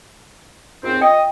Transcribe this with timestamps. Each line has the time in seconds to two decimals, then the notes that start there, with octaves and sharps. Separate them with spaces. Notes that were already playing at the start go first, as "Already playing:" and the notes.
0.84 D#2 G#2 C4 F4
1.01 D#5 G5